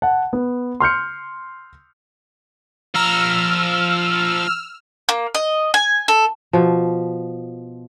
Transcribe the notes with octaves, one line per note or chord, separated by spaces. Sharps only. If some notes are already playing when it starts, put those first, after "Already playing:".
F#5 A5
B3
C6 F6 G6 C#7
F3 A#5 E6 F6
A#3
D#5
G#5
A4
B2 F3